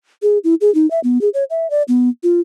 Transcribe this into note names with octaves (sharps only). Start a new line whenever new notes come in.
G#4
E4
G#4
D#4
E5
B3
G#4
C#5
E5
D5
B3
F4